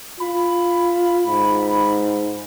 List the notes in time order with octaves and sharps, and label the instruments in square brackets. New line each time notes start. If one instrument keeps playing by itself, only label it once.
[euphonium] F4 [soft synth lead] B5
[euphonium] G#2